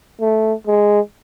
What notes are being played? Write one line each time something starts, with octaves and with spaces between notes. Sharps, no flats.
A3
G#3